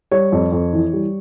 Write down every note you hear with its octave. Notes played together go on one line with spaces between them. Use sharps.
G3 C#5
F2
F2
E3
G3